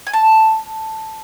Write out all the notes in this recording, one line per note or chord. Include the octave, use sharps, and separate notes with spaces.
G#5
A5